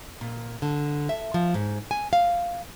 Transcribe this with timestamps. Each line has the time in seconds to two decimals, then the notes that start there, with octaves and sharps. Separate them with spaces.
0.21 A#2
0.62 D3
1.09 E5
1.34 F3
1.54 G#2
1.91 G#5
2.13 F5